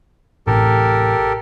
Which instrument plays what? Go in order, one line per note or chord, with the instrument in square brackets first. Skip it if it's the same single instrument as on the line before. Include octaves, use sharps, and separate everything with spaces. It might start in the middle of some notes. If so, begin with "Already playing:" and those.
[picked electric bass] A1 A2 C3 [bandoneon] G4 A4 A#4